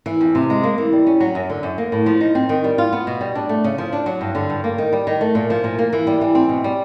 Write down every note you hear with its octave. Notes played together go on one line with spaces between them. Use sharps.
E3
F2
C3
G#3
A#3
E3
G3
C#4
F#3
F#2
D3
F#2
A#3
A2
F3
D#4
C4
D#3
G3
F4
B3
B2
G3
D4
A3
C#3
F3
D4
F#3
G2
D3
G2
A#3
D#3
G3
D#3
A3
A#2
F3
A#2
A#3
E3
G3
E3
C4
B2
G3